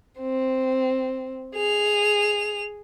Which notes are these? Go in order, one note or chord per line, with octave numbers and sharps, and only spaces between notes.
C4
G#4 F7